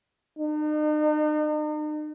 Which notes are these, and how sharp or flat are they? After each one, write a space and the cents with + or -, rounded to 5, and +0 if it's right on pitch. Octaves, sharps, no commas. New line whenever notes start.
D#4 -40